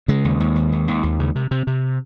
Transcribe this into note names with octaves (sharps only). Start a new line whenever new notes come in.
C#3 G#3
D#2
D#2
D#2
D#2
D#2
D#2
C#3
C3
C3
C3